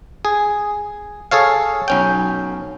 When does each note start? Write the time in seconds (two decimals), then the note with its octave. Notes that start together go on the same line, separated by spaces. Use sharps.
0.25 G#4
1.31 G#4 A4 C#5 F5
1.88 B1 C#4 G5